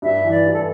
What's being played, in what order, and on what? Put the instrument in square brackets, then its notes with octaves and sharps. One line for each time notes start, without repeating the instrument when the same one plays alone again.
[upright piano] G2 [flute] E5
[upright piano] E3
[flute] D5
[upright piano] G2
[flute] A4